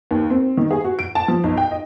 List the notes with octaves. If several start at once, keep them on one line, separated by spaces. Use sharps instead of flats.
D#2
C4
D#3
G#4
F#4
D7
A5
F3
B1
G5
D#5